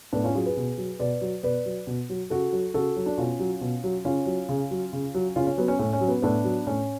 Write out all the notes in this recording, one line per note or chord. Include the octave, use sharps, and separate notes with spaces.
A2 B3 D4
C#4 F4
F#3 F4 G#4
G#4 B4
B2
F#3
B2 B4 D5
F#3
B2 B4 D5
F#3
B2
F#3
C#3 F#4 A4
F#3
C#3 F#4 A4
F#3
D4
B2 C#4 F4
F#3
B2
F#3
C#3 C#4 F4
F#3
C#3
F#3
C#3
F#3
C#3 C#4 F4
C#4
F#3 B3
C#4
A2 C#4
C#4
F#3
B3
A2 B3 D4
F#3
A2 C#4